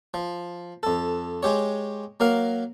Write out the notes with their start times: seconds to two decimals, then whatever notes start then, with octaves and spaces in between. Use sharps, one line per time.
0.14 F3
0.83 F2 A4
1.43 G#3 G4 C#5
2.20 F#3 A#3 A#4 F5